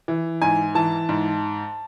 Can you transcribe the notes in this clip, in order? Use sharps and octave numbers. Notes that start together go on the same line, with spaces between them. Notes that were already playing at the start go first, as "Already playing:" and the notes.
E3
G#2 G#5
E3 A5
G#2